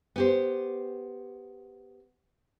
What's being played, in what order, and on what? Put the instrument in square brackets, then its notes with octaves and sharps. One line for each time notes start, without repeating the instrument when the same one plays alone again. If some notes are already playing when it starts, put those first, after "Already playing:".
[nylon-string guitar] B3 G4 C5